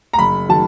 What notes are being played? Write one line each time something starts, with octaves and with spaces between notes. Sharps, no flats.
A#5
F#1 B5
D#3 F#3 A5